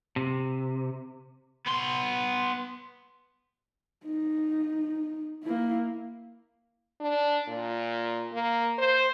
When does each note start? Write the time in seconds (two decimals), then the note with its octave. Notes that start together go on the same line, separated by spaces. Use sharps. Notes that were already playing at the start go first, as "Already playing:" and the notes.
0.16 C3
1.66 B3 C6
4.05 D#4
5.43 A#3 E4
7.00 D4
7.48 A#2
8.32 A#3
8.78 C5